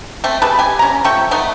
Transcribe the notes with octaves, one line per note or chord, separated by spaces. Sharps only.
A3 C4
G4 G#4 B4 A5
G4 G#5
C#4 A#5
F3 A3 G5 C#6
A3 B3 D#4